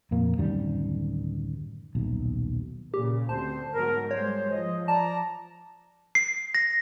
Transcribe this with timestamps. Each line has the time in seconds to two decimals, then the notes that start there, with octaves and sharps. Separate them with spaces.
0.11 F2 A#2 A#3
0.37 D1 F#2 D#3 G3
1.95 D#1 B1
2.94 A#2 C#3 G4
3.29 D2 C4 C5 A5
3.74 G#2 F#3 B3 A#4
4.11 G3 G#3 C5 C#5
4.51 F3 D#5
4.88 D5 A5 A#5
6.15 C7
6.55 A#6